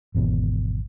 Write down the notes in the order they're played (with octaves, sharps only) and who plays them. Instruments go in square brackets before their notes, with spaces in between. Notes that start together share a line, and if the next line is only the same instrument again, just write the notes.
[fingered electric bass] G#1 E2 B2